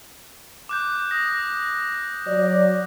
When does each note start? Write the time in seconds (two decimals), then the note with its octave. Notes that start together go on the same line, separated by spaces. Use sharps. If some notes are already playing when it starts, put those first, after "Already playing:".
0.69 D6 F#6 G6
1.11 D#6 A#6
2.27 F#3 D5